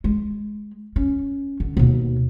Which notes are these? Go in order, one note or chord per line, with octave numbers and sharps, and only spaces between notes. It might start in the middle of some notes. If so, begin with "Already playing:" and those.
G#3
C#4
D3
D#2 B2